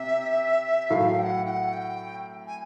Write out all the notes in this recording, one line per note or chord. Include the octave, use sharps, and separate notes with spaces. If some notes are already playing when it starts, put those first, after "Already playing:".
Already playing: C3 E5
A2 F#3 A3 F5
G5
F#5
G5
F#5
G5
G#5